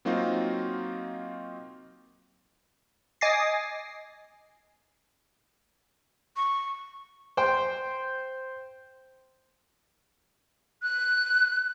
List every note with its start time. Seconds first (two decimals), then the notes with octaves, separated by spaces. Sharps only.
0.05 F#3 A#3 C4 D#4 F4 F#4
3.21 D#5 G#5 D6 A6 A#6 C7
6.36 C#6
7.37 C5 G5
10.82 F#6